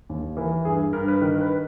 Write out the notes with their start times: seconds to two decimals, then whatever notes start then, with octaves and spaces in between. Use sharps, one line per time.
0.09 D#2
0.37 E3 A#4
0.65 G2 G#4
0.93 G2 A#4
1.08 B4
1.21 D#3 A#4
1.41 B4